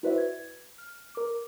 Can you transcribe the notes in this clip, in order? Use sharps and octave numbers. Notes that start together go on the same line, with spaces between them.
E4 F#4 B4 C5 D5 E5
G#6
F6
A#4 D6